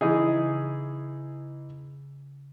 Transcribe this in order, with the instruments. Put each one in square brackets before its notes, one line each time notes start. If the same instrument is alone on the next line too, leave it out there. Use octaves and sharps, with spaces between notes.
[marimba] C#3 [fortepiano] E3 D#4 G#4